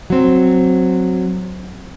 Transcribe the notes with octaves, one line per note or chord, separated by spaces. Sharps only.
F#3 C4